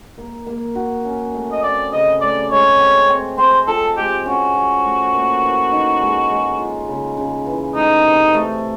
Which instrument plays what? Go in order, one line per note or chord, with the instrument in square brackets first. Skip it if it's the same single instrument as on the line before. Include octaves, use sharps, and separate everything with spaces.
[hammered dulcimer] A#3
A#3
F#4
C#4
A3
[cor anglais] D#5
[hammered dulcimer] C4 [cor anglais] D5
[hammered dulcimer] C#3 [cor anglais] D#5
[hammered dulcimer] A3 [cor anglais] D5
[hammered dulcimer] G#3 [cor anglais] C#5
[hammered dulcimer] C4
C4
[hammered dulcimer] C4 [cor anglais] C5
[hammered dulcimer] F4 [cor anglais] A4
[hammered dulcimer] G#3 [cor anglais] G4
[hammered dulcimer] C#4 [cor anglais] F#4
[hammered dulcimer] F3
A3
A#3
E3
D#4
G#3
G#3
F4
C#3
C#3
E3
[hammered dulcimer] A3 [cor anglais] D#4
[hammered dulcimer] C3
A3